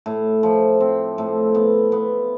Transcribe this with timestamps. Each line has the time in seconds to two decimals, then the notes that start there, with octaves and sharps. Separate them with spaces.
0.06 A2
0.43 F3
0.80 C4
1.18 A2
1.55 B3
1.92 B3